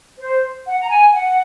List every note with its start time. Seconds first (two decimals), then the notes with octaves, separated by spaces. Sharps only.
0.19 C5
0.66 F#5
0.81 A#5
0.89 G#5
1.13 F#5